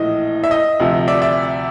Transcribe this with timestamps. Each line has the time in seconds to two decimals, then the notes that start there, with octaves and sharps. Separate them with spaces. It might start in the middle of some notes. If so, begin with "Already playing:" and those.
Already playing: A#1 A2 E3 D#5
0.44 E5
0.51 D#5
0.80 D2 C3 F3
1.08 D5 E5
1.22 D5 E5